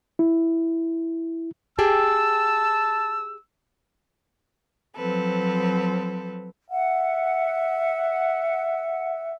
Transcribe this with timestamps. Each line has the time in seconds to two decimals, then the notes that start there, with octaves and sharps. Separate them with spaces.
0.19 E4
1.79 G4 G#4 G5 A5 E6
4.96 F3 F#3 C4 A4 B4
6.70 E5 F#5